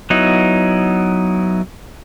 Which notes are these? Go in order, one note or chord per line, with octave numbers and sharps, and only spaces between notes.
F#3 B3 D#4 E4